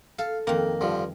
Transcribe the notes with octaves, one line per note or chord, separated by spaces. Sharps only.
A4 F5
F2 D#3 A#3
G2 D3 F3